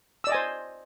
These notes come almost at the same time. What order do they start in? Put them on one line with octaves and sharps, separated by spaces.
E6 D5 D#5 G#5 C5